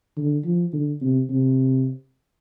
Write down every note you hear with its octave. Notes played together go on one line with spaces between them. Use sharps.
D3
F3
D3
C3
C3